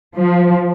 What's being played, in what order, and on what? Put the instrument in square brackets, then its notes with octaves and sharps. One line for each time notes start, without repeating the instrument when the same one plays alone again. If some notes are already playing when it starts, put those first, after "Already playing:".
[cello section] F3